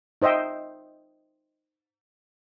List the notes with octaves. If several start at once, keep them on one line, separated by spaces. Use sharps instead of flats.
D#4 C5 D#5 E5 G5